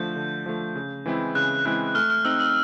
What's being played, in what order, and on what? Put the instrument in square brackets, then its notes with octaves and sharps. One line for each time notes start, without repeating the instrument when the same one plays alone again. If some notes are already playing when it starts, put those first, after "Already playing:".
Already playing: [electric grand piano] D3 F3 A3 [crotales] G6
[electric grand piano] D3
F3 A3
C#3
E3 G#3 C4 E4
[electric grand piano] C#3 [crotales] F#6
[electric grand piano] E3 G#3 C4 E4 [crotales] F#6
[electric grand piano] A3 [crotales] F6
[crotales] F6
[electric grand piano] C4 D#4 [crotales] E6
[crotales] E6